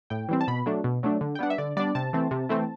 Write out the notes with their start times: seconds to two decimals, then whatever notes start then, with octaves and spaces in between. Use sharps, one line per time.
0.10 A2 G5
0.29 E3 G3 C4
0.41 A5
0.48 B2 B5
0.66 F#3 A3 D4
0.84 B2
1.03 F#3 A3 D4
1.21 D3
1.35 G5
1.39 G3 B3 D4 F#5
1.50 E5
1.58 D3 D5
1.77 G3 B3 D4 D5
1.95 C3 A5
2.13 E3 A3 C4
2.31 C3
2.49 E3 A3 C4